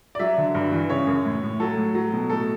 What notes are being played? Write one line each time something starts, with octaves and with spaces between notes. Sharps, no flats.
D5
F#3 E5
D3
G2
E3
C#3 C#5
F#2
A2
A2
F#3 A4
A2
F#3
B2
A2 A4